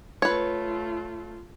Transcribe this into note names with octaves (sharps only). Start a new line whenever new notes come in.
A3 F4 B4 C#5